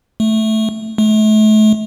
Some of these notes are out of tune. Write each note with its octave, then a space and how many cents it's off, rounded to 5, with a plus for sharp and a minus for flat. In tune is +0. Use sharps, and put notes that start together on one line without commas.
A3 -5
A3 -35